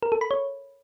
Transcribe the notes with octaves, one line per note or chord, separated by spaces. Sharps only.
A#4
A4
B5
C#5